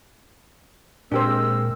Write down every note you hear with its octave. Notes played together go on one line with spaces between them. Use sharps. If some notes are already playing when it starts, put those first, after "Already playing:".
A#2 G#3 C4 D4 G4 A#4 C5 E6